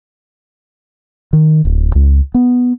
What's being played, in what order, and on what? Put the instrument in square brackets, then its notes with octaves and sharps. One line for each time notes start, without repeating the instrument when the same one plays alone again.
[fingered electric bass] D#3
D1
C#2
B3